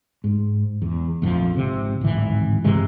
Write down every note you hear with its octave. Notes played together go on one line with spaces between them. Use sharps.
G#2
E2
A#1 F2 D#3 F3
G#1 C3
D1 G#1 E3
G2 C3 E3 G#3